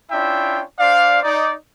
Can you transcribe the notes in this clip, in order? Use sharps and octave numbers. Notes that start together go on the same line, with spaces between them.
C#4 D4 E4 F4 E5 G5
D4 C5 D5 F5
D#4 D5